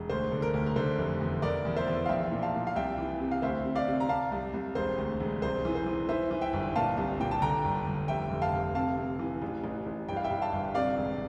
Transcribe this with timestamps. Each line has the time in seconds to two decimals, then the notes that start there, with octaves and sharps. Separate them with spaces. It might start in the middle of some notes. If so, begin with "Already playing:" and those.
Already playing: E1
0.09 D2 C5
0.31 D3
0.42 A#4
0.53 D2
0.66 A#4
0.76 D3 C5
0.99 F1
1.21 E2
1.42 E2 A#4 D5
1.65 E2
1.76 C5 E5
1.87 E2
2.05 F5
2.09 A#1 E5 G5
2.32 A#2
2.43 F5 A5
2.54 A#2
2.67 F5
2.76 C2 E5 G5
2.98 E3
3.20 C3
3.31 F5
3.42 D2 C5 E5
3.64 C3
3.75 D5 F5
3.87 C3
4.00 A#5
4.09 C3 F5 A5
4.32 C2
4.54 C2
4.75 E1 C5
4.98 D2
5.20 E1
5.42 C2 C5
5.65 E3
5.75 C5
5.86 E3
6.09 E3 C5 E5
6.31 E3
6.41 E5 G5
6.53 G1
6.76 A#2 F5 A5
6.97 C2
7.20 A#2 G5
7.31 A5
7.42 D3 G5 A#5
7.64 G1
7.86 G1
8.08 F1 E5 G5
8.31 F1
8.42 F5 A5
8.53 F1
8.75 C3 F5 A5
8.97 C3
9.19 E3
9.42 A1
9.64 A1
9.86 A1
10.08 G2 G5
10.16 F5
10.24 E5 G5
10.30 G2
10.42 F5 A5
10.53 G1
10.74 C3 D5 F5
10.97 E1